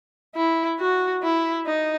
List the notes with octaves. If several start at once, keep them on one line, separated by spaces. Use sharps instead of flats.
E4
F#4
E4
D#4